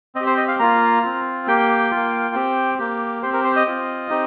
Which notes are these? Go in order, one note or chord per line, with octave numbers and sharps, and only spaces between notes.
C4 D#5
G4
C5
D#5
F5
A#3 F4 A#5
C4 F4
A#3 G4 G5
A#3 F4
C4 G4
A#3 G4
C4 G4 C5
A#4
C5
D#5
C4 F4
C4 D#4 G4